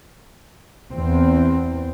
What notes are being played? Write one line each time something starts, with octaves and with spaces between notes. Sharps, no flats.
E2 C4